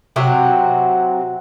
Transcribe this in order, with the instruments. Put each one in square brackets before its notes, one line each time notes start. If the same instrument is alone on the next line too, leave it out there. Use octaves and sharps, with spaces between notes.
[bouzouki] C3 F#3 C4 F#4